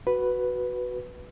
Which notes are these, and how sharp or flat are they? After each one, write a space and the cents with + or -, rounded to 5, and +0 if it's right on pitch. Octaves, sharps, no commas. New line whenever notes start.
F#4 +0 B4 +0